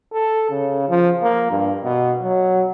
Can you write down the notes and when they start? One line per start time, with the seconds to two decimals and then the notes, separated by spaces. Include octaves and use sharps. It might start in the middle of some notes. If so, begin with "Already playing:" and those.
0.13 A4
0.50 C#3
0.89 F3
1.22 A#3
1.51 G2
1.84 B2
2.22 F#3